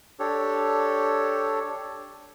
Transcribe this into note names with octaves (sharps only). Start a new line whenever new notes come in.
D4 G4 A4 C#5